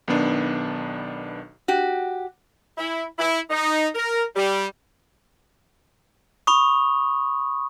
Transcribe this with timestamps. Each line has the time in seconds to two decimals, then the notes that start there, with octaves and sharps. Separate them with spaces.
0.08 B1 D#3 B3 D4
1.68 F#4 G4
2.78 E4
3.19 E4
3.50 D#4
3.95 A#4
4.35 G3
6.47 B5 C#6 D#6